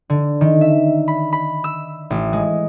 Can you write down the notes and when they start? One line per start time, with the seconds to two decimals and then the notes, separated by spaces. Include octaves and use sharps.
0.10 D3
0.41 D#3
0.61 E5
1.08 B5
1.33 B5
1.64 E6
2.10 A1
2.33 G#3